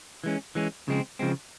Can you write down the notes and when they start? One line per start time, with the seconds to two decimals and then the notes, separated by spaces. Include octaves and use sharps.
0.24 E3 G#3 C#4
0.55 E3 G#3 C#4
0.88 C#3 F3 G#3 C4
1.19 C#3 F3 G#3 C4